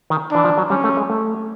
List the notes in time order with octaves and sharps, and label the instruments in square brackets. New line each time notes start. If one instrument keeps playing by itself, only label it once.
[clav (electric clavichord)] D#3
[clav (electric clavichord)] E3 [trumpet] D4
[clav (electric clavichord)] F3
F#3
[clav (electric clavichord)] G3 [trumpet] C#4
[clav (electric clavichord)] A3
G#3
A3